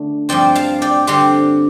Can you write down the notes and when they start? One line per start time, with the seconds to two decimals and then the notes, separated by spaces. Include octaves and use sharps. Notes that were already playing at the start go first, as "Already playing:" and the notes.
Already playing: D3 A3
0.29 G2 F3 C4 D5 G5
0.55 F5 A5
0.82 D5 G5
1.07 D3 G3 C4 G4 C5